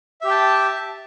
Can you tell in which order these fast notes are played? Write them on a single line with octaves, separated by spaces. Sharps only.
E5 G4 G5 A5